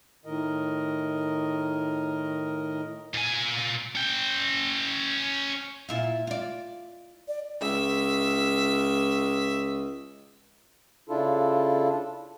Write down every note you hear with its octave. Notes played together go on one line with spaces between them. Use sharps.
A2 D#3 A#4 D#5
A#2 G#5
C#4 G5
A#2 E4 F4
F4 D5
D5
C#2 E5
C#3 D4 E4 F4 A4